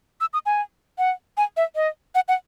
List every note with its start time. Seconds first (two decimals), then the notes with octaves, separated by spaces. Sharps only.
0.21 E6
0.33 D#6
0.46 G#5
0.98 F#5
1.37 G#5
1.57 E5
1.76 D#5
2.15 F#5
2.28 F#5